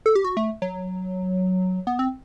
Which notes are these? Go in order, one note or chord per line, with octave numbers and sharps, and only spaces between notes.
A4
G4
F#4
A3
F#3
B3
C4